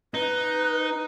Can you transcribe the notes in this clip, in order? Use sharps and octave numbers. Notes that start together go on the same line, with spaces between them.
D#4 B4